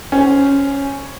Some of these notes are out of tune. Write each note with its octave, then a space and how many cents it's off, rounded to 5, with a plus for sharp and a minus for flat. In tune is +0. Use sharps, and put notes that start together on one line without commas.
C#4 +0 C5 -10